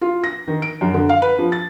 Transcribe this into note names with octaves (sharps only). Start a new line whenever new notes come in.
F4
A#6
D#3
D7
F#2
D3
F5
B4
F3
A6